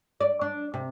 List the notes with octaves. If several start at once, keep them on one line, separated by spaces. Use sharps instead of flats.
D5
D4
C3